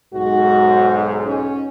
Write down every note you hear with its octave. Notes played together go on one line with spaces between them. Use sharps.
B1 G#2 F#4
C#4